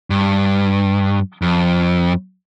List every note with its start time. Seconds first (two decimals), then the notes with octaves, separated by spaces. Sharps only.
0.10 G2
1.42 F2